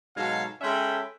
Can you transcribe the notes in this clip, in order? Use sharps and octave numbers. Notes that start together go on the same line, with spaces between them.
G#2 B2 F#3 G#3 A4 F5
G#3 C#4 A4 E5 G5 B5